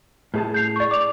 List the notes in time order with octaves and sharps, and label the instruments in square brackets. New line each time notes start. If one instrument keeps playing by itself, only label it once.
[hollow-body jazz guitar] A2 G#4 A5
[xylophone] G6 C7 F7
D5 C#6
D6 F7